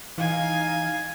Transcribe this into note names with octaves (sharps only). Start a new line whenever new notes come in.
E3 D#4 F5 G#5